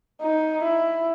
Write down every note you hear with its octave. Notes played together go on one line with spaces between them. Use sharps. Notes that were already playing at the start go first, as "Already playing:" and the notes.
D#4
E4